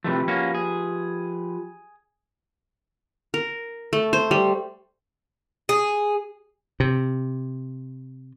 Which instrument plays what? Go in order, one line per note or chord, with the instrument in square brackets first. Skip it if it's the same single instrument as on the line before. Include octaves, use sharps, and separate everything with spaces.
[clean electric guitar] C3 E3 A3 [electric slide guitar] F3 G4 B4
[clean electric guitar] A#3 C#4 F#4
G#4
[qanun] A#4
A3
C5
G3
[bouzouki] G#4
[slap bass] C3